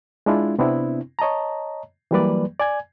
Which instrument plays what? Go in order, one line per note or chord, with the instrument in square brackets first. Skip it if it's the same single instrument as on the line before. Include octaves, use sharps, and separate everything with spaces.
[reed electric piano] G#3 D4 E4 F4
C3 B3 C4 D4 E4
C#5 D#5 A5 A#5
E3 F#3 G3 A#3 B4 D5
D5 G#5 G#6